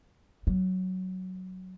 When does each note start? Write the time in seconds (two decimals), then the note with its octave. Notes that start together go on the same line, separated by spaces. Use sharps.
0.47 F#3